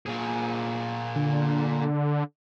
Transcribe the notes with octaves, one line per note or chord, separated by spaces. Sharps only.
A#2 G#4
D3